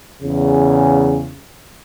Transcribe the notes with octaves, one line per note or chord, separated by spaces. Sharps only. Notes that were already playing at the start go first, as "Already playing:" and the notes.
E2 C#3